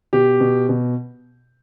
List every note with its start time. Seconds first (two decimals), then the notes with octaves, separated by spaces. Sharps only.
0.13 B2 G4
0.40 B2
0.69 B2